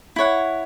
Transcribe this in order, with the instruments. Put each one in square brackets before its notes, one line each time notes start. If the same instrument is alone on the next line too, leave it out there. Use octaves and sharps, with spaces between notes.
[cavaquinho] E4 C#5 F#5